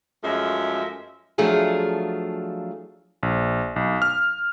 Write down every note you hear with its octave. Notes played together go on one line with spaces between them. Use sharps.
F#2 F3 G#3 A3 G#4 E5
F3 F#3 A3 D4 F4 G#4
A#1
B1
F6